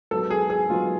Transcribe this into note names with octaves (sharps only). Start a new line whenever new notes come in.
G#2 F#3 B3 A4
G#4
G#4
G#2 F#3 B3 F4